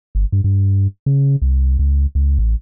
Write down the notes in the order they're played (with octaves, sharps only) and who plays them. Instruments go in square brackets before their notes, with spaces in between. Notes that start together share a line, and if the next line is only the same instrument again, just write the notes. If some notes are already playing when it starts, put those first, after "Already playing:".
[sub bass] G1
G2
G2
C#3
C2
C#2
C#2
A1